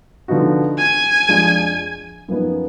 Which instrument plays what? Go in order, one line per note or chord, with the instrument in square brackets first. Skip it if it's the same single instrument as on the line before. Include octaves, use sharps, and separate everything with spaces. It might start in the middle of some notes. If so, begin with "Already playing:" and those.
[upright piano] D3 F3 B3 D#4 F#4
[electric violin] G#5
[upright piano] F2 F3 G#3 D4
F#2 F3 B3 D#4